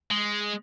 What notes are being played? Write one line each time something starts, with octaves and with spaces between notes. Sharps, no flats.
G#3